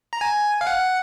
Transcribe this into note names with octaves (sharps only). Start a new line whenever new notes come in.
A#5
G#5
F5
F#5